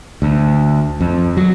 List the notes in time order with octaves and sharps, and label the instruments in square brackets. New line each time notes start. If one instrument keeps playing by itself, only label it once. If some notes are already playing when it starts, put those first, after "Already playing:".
[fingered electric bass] D2
F2
F#3